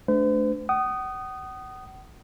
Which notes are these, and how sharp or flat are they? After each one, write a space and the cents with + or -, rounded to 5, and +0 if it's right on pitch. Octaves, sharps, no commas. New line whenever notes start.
A3 -20 D4 -5 C5 -45
F#5 +40 D#6 -10